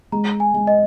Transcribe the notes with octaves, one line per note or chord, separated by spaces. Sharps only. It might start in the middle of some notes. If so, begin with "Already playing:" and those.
G#3 A#5
G#5
G#3
D#5